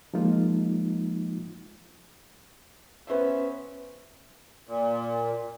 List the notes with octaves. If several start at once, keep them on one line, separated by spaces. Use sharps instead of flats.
F3 G#3 A#3 D#4 F4
B3 C#4 C5 E5
A#2